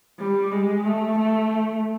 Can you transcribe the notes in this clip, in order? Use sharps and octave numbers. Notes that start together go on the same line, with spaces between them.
G3
G#3
A3
A3